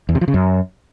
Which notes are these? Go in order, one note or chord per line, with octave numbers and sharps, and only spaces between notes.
E2
C3
F3
C#3
F#2